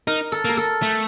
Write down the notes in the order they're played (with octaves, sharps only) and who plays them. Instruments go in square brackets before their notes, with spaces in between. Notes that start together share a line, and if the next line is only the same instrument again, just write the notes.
[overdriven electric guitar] D#4 [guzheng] A#4
[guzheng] A4
[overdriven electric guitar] A#3 [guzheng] A#4
[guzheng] A4
[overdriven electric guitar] A3